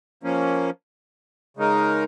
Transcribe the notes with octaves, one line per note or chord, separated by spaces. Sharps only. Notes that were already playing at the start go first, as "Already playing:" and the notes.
F3 A#3 C#4
C#3 G#3 D#4 A#4